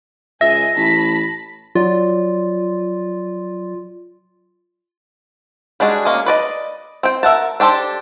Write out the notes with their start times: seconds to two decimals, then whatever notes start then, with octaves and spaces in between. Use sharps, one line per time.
0.41 C#2 D#5 E5 G#5 A#6
0.76 A1 A5 B5 B6
1.75 F#3 F4 D5
5.80 G3 G#3 D4 F#4 G#4
6.05 G#3 A#3 C#4
6.26 B4 D5 D#5
7.03 C4 G5
7.23 A#4 E5 F#5 A5
7.60 D4 G4 A4 C5 D5